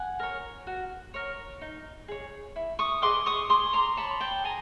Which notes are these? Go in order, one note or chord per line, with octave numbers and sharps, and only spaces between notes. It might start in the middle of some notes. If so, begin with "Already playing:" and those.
Already playing: F#5 G#5
A#4 C#5
F#4
A#4 C#5
D#4
G#4 C#5
E4
C#6 D#6
G#4 B4 D#5 C6 D6
C#6 D#6
G#4 C6 D6
A#5 C6
C#5 A5 B5
G5 A5
G#4 G#5 A#5